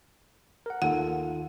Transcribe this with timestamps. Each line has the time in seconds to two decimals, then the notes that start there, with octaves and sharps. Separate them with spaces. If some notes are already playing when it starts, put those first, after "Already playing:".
0.66 A#4 F#5
0.82 D#2 F4 A4 F#5 D#7